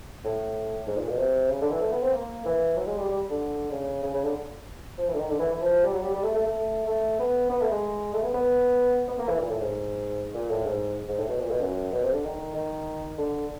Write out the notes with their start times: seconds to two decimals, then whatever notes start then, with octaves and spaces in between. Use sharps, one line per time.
0.24 A2
0.87 G#2
0.98 A#2
1.09 B2
1.18 C3
1.50 C#3
1.61 D3
1.71 E3
1.82 A3
1.92 B3
2.03 C4
2.13 A#3
2.45 E3
2.77 F#3
2.87 G#3
2.97 G3
3.09 G3
3.30 D3
3.71 C#3
4.03 C#3
4.14 C#3
4.24 D3
4.98 F3
5.08 E3
5.14 D3
5.19 D#3
5.30 D3
5.39 E3
5.50 E3
5.61 F3
5.84 G3
5.92 F#3
6.03 G3
6.14 G3
6.23 A3
6.34 A3
6.45 A3
6.86 A3
7.19 B3
7.49 B3
7.61 A3
7.71 G#3
8.14 A3
8.23 B3
8.34 B3
9.08 B3
9.18 A#3
9.29 E3
9.39 A#2
9.50 A2
9.61 G#2
10.34 A#2
10.51 A2
10.66 G#2
11.08 G#2
11.19 A2
11.28 B2
11.40 A#2
11.50 B2
11.61 F#2
11.92 B2
12.03 C3
12.13 D3
12.24 D#3
12.55 D#3
13.18 D3